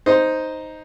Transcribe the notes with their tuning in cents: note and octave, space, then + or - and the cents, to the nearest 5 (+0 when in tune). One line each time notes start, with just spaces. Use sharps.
D#4 +0 C5 +0